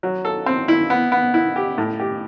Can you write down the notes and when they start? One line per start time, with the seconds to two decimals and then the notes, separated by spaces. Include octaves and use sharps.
0.03 F#3
0.25 A4
0.46 C4
0.68 E4
0.90 B3
1.12 B3
1.34 E4
1.56 G4
1.78 A2
2.00 G4